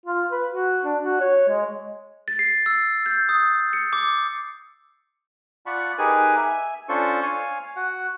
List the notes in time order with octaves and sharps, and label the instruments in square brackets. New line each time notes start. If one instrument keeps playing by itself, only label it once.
[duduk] F4
B4
F#4
D4
F#4
C#5
G#3
[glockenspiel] A6
C7
E6
G6
D#6
C#7
D6
[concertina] F4 D5 F#5 A5 B5 C#6
D#4 G4 G#4 A#4 B4 G#5
E5 G#5
C#4 D4 F4 A4 C5 C#6
C#5 F5 G#5
F#4 F#5